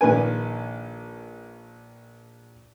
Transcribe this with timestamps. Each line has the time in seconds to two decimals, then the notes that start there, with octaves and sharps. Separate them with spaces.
0.01 A#1 D#3 A#3 B4 G#5